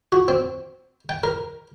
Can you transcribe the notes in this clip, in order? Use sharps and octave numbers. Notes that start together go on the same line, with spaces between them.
F#4
C4
G5
A#4